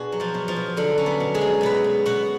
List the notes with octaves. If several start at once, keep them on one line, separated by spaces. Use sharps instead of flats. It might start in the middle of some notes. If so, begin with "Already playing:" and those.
Already playing: B2 D4 F#4 G#4
F#3
F3 F4
B2
F3 F4
B2
D3 F#3 D4
F#3 C#4
B3
B2
G#3 G#4
F#3
B2 B3 B4
B2
B2 F#4 F#5